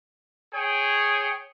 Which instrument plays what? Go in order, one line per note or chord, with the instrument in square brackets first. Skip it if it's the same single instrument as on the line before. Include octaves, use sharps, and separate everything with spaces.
[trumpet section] G#4 C#5 G5